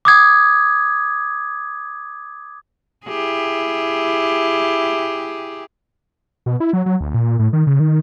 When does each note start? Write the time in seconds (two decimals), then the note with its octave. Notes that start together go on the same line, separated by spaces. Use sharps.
0.05 D6 D#6 G#6
3.07 E4 G4 G#4
6.46 B2
6.60 E4
6.73 F#3
6.86 F#3
7.01 D2
7.14 A#2
7.39 A2
7.53 D#3
7.67 C#3
7.80 D#3